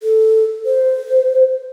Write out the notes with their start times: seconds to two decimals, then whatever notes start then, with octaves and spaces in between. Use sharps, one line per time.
0.03 A4
0.66 C5